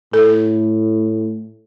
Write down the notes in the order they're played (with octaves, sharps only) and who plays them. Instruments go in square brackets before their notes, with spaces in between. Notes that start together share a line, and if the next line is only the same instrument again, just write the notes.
[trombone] A2 [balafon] A4